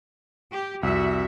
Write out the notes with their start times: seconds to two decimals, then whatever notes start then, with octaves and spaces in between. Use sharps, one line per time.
0.52 G4
0.83 C2 F2 F#4 E5